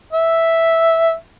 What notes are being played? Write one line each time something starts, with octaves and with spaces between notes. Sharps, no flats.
E5